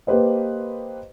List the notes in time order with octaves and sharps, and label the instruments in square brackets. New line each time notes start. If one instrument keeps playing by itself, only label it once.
[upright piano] A#3 G4 B4 C5 D#5